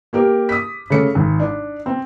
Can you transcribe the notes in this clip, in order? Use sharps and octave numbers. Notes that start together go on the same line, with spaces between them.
A#3 G4 A#4
D#6 B6
C#3 A3 C#7
G#1
D4
C4